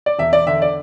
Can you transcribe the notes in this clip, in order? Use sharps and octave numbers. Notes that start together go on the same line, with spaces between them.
D5
E1 E5
E1 D5
D3 E5
D5